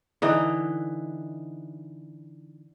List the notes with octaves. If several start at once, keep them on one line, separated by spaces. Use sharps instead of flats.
D3 E3 D#4